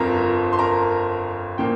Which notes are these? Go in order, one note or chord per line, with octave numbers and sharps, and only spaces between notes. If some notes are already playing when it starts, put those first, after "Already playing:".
Already playing: G1 F2 F3 C4 A#4 A#5
C6
A#4 A#5
A#2 F3 A#3 G5